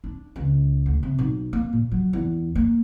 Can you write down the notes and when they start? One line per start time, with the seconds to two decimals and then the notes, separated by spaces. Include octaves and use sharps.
0.04 D4
0.36 C#2
0.86 D2
1.03 C3
1.19 B1
1.53 A#3
1.73 A#2
1.92 F#3
2.13 E2
2.55 A#3